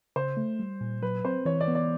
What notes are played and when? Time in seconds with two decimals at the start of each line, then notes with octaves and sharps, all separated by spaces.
0.16 C#3 C5
0.37 A3
0.59 G3
0.81 A#2
1.02 F#3 B4
1.25 C4 C5
1.46 E3 C#5
1.61 D5
1.68 B3
1.75 D5